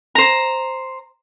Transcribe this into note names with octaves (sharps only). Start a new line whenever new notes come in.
C5 A#5